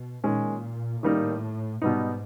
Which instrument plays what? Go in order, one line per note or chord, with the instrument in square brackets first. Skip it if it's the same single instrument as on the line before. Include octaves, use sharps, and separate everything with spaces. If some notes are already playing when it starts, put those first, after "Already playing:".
Already playing: [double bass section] B2
[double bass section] A#2 [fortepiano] D#3 G#3 C#4
[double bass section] A2 [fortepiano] D#3 G3 A#3 D#4
[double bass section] G#2 [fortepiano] B2 G3 B3 D#4